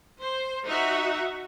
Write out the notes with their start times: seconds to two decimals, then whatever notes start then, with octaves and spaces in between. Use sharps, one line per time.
0.20 C5
0.65 D#4 F#4 E5